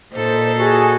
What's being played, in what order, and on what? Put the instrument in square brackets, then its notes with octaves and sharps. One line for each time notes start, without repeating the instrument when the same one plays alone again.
[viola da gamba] A#2 D#4 A4 [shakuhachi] C5
[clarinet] F#4 [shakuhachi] G#4